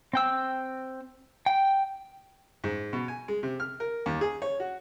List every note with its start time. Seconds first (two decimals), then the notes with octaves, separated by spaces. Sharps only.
0.13 C4 G5 E6
1.46 G5
2.64 G#2
2.93 B2
3.08 G#5
3.28 G#3
3.43 C3
3.60 F6
3.80 A#4
4.06 D#2
4.21 G#4
4.42 C#5
4.60 F#4